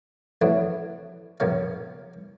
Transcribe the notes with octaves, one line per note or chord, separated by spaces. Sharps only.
F2 E3 A3 C#4 D4 F#4
A#1 F#2 B2 F#3 C#4 F5